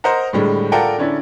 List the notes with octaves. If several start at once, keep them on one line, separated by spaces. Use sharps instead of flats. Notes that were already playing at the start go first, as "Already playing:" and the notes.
A#4 C5 D#5 F#5 A#5
A2 D3 G3 G#3
F4 A4 A#4 D5 F#5 G5
D3 C#4 D4 E4